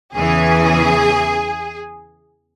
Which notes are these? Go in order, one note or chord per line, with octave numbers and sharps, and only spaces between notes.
E2 C#3 E3 G#4